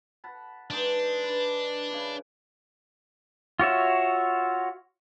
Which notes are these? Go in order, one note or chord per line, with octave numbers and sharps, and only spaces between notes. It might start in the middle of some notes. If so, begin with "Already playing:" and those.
F#5 A5 B5
E3 G#3 D4 D#4
B4
C#3 E4
F4 F#4 C#5 E5